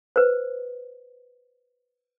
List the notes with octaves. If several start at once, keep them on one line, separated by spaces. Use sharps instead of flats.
B4 C5